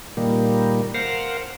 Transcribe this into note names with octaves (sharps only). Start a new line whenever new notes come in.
A#2 D#3 G3 A#3
A#4 C5 F5 F#5